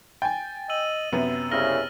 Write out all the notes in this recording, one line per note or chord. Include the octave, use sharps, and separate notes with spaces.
G5 G#5 A6
D#5 E6 D#7 F#7
F#2 C3 B3 E5
C2 C#3 E5 F6 A#6 F#7